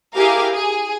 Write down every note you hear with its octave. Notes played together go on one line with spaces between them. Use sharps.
E4 G4 G#4 A#4 F5
G#4